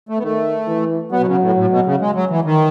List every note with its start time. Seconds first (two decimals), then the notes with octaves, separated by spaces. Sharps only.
0.09 A3
0.18 B3
0.23 D#3 A3
0.67 E3
1.12 F#3 B3
1.19 B2
1.26 C#3
1.41 A2
1.56 A2
1.70 B2
1.85 C#3
2.01 G#3
2.15 F#3
2.30 E3
2.45 D#3